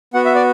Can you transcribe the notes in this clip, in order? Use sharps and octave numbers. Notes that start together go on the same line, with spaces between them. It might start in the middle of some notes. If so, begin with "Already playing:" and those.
B3 F#4 F#5
E5
D5